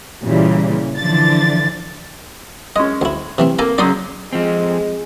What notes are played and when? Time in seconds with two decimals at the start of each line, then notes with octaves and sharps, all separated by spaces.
0.22 A#2 C#3 E3 G3
0.97 D3 E3 F3 D4 A6
2.76 G#3 C#4 D#5
3.01 D2 E4
3.38 C3 E3 C4
3.59 A#3 A4 G#5 A#5
3.78 F#2 C#3 D5 C6 D#6
4.33 F3 G#3 C4